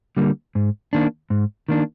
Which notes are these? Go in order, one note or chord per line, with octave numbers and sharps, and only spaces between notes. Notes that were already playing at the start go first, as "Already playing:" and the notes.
D3 G3 A#3
G#2
D#3 A#3 D4
G#2
D#3 A#3 D4